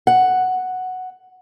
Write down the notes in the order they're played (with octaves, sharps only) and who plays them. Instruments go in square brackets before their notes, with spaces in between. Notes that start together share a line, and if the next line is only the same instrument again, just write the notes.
[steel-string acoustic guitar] F#5